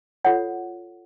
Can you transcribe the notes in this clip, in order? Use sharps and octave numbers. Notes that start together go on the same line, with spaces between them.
F4 A4 C#5 F#5